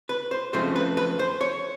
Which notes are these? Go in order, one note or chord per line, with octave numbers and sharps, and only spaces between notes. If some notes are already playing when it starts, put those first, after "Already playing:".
B4
C5
F2 C#3 F3 A3 C4 C5
B4
B4
C5
C#5